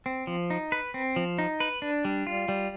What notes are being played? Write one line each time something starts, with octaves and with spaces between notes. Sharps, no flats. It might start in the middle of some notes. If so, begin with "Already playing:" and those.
C4
F3
D#4
B4
C4
F3
D#4
B4
D4
G3
F4
G3